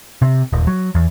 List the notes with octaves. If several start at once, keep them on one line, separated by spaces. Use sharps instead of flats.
C3
D#1
F#3
E2